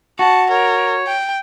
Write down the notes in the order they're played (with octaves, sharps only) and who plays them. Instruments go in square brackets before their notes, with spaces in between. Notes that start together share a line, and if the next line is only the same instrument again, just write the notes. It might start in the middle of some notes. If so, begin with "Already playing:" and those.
[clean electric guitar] F#4 [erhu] A5 [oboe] C#6
[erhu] A#4 [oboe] C#5
[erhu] G5